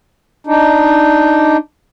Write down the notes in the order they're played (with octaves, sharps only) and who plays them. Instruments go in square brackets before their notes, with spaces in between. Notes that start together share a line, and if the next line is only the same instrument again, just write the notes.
[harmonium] D4 D#4